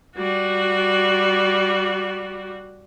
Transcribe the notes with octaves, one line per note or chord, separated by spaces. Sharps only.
G3 F#4